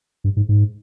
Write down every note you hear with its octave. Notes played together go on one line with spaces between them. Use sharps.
G2
G#2
G#2